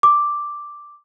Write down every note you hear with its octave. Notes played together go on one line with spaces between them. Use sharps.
D6